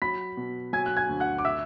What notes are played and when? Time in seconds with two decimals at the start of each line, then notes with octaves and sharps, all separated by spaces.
0.02 F#3 B5 B6
0.37 B2
0.73 F#3 G#5 G#6
0.86 F#6
0.97 G#5 G#6
1.09 D2
1.20 F#5 F#6
1.38 D6
1.45 E5 E6